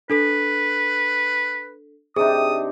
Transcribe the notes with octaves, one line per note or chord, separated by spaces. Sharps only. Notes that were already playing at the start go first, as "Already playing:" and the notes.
D4 A4 B4 B6
C3 D4 D#4 G#4 D#6